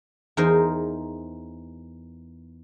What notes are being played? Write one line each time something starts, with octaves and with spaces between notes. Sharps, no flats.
E2 D#4 A#4 C5 G#5